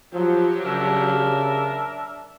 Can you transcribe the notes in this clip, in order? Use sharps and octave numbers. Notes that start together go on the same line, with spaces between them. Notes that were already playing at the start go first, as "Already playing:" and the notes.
F3 F#3 G4
C#3 D4 A#4 E5